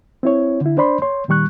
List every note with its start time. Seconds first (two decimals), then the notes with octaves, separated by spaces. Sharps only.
0.23 C4 E4 C#5
0.61 D3 E4
0.77 D4 C5 D5 B5 C6
1.02 C#5 C6
1.28 A#2 D#3 G3 C#6 F#6